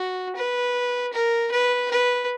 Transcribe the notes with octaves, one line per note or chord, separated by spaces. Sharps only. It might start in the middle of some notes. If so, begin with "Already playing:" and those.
Already playing: F#4
B4
A#4
B4
B4